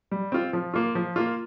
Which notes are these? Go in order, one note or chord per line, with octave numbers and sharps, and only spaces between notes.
G3
C4 F4
F3
A#3 F4
F3
A#3 F4